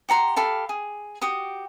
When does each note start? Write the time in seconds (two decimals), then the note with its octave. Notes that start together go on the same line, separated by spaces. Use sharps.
0.09 G4 F#5 A#5 C6
0.36 G4 A4 F5 B5
0.69 G#4
1.22 F#4 G4 D#6